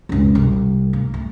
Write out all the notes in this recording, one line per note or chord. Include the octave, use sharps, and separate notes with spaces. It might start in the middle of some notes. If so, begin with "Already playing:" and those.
F#1 C#2
C2
A#3
A3